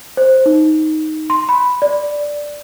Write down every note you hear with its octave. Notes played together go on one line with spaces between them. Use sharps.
C5
D#4
C6
B5
D5